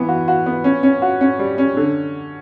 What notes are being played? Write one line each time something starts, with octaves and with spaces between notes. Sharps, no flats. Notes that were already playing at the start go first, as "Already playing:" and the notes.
Already playing: E3 B3
F#4
F#4
B3
C#4
C#4
F#4
C#4
G3
C#4
D3